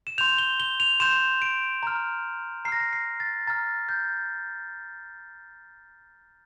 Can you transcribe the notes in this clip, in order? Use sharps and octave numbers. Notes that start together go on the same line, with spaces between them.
E7
C6 G6 F7
G7
G7
F7
C6 G6 E7
D7
A#5 F6
A#5 F6 A#6 C7
C7
C7
A6
A#5 F6 A6
G6